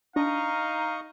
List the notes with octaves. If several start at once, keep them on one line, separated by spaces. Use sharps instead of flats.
D4 D#4 D#5 F5 A#5 C#6